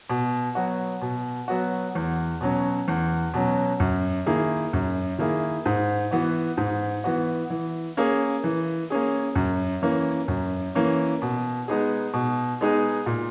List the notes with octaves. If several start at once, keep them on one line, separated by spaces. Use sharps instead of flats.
B2
F#3 B3 F#4
B2
F#3 B3 F#4
E2
B2 F#3 C#4
E2
B2 F#3 C#4
F#2
D#3 A#3 E4 G#4
F#2
D#3 A#3 E4 G#4
G#2
E3 B3 F#4
G#2
E3 B3 F#4
E3
A#3 C#4 G#4
E3
A#3 C#4 G#4
F#2
E3 A#3 C#4
F#2
E3 A#3 C#4
B2
G#3 B3 D#4 G#4
B2
G#3 B3 D#4 G#4
A#2